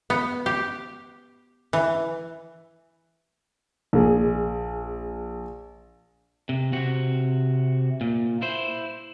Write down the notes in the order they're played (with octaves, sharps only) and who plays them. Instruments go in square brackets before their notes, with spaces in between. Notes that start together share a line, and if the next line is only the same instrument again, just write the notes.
[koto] B3
G4
E3
[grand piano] A#1 G#4
[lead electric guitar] C3
C3 F#4
A#2
E4 C5